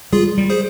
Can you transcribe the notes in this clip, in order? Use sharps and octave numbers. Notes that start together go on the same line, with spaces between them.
G3 F4 G#4
G3
G#4 C5